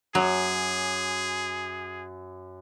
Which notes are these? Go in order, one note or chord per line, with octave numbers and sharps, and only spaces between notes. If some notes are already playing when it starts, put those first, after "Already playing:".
F#2 F#3 G#4